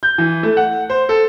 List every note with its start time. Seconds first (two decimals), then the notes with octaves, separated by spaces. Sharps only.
0.03 G6
0.18 E3
0.43 A3
0.57 F#5
0.90 C5
1.09 A4